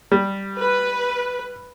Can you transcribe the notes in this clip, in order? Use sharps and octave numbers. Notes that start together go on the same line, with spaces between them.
G3
B4